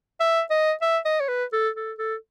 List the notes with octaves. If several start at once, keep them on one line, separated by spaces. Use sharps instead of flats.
E5
D#5
E5
D#5
C#5
B4
A4
A4
A4